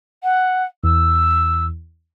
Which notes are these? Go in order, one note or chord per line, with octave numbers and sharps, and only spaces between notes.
F#5
E2 E6